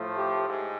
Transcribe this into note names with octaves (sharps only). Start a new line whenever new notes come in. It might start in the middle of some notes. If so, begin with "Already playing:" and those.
Already playing: A2 F3 A3
G4
G#2